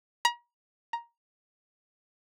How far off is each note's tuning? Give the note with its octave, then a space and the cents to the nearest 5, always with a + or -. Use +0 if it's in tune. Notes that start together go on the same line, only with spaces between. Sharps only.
A#5 +40
A#5 +10